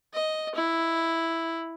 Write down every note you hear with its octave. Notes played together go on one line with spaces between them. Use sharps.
D#5
E4